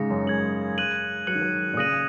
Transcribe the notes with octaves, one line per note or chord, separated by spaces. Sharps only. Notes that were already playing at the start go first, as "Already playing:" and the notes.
Already playing: G#2 C#3 D#6 A#6 C#7
F#2
G#3 G#6 F#7
G#3 F#6 D#7 F#7
F#3 F#6 C#7 F#7
D#3
F#3
A#2
C#3 D#6 F#6 A#6 D#7 F#7